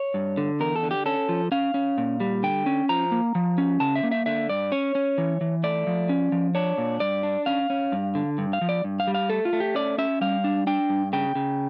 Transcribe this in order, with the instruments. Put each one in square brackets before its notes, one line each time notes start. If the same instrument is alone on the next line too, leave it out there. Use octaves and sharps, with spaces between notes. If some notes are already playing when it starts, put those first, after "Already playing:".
Already playing: [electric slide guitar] C#5
G2
D3
E2 A#4
A4
D3
G4
C#4 A4
F3
C#4 F5
C#4
A#2
G3
D3 G5
C#4
F3 A#5
A#3
F3
C#4
C#3 A5
E5
A#3
E5
D3 E5
G2 D5
C#4 C#5
C#4
E3
E3
A3 D5
F3
C#4
F3
D4 C#5
A#2
G2 D5
D4
C#4 F5
C#4
G2
D3
G2
F5
F3
D5
G2
F5
G3
F5
A3 A4
F4
A3
G4
C#4 D5
C#4 E5
G3 F5
D4
D4 G5
G2
C#3 G5
C#3